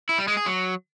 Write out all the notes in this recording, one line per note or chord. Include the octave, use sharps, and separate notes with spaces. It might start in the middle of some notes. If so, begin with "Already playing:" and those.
E4
G3
G#3
G#4
F#3